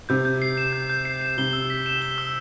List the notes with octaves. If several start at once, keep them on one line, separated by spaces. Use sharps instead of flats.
C3 G6
G6
C7
E7
G6
G6
C7
E7
C3 G7
E6
B6
E7
G7
E6